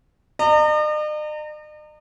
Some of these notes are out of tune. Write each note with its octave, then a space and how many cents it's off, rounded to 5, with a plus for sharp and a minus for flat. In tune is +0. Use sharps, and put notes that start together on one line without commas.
D#5 -45 A#5 -35